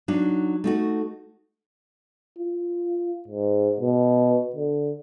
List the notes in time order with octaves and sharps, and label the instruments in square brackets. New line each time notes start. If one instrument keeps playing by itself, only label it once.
[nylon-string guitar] F#3 D4 D#4
A3 D#4 F#4
[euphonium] F4
G#2
B2
D3